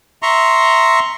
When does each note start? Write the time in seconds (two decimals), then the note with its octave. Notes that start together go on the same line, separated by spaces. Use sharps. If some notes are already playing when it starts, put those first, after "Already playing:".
0.23 E5 A#5 C6 C#6